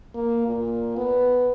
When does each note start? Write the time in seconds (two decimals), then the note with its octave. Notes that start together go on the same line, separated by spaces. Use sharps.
0.15 A#3
0.47 A#2
0.97 B3